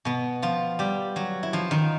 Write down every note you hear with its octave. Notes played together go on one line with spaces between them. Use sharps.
B2 B3
F3 F4
G3 G4
F#3 F#4
E4
F3 F4
D#3 D#4